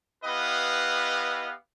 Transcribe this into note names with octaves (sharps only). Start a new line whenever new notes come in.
B3 E4 G4 B4 D#5 F5